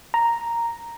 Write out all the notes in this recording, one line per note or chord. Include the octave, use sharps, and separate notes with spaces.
A#5